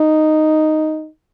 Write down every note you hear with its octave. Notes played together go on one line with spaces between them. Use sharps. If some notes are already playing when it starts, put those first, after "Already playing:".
Already playing: D#4